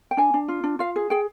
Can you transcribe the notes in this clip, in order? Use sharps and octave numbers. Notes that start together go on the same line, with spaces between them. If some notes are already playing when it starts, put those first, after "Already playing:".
G5
D4 G#5
D4
F4
D4
F4 F5
G#4
G#4 G5